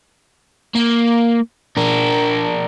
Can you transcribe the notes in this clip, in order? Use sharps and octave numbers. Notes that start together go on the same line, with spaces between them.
A#3
D4 A#4